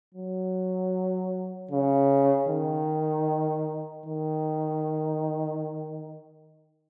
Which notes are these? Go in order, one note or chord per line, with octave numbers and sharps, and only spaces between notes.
F#3
C#3
D#3
D#3